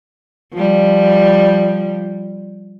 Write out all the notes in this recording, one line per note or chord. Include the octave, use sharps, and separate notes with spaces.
F3 G3